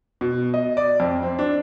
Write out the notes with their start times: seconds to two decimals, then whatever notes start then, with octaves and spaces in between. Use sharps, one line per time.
0.21 B2
0.54 D#5
0.77 D5
1.00 F2
1.23 C4
1.39 D4